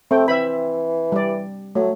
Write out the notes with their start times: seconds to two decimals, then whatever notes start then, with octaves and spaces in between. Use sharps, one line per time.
0.11 A3 C4 G5
0.28 E3 E5 B5
1.12 G3 D5
1.75 F#3 A3